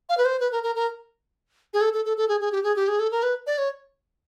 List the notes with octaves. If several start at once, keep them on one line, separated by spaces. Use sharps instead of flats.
F5
B4
C5
B4
A#4
A#4
A#4
G#4
A4
A4
A4
A4
G#4
G#4
G4
G#4
G4
G#4
A4
A#4
B4
D5
C#5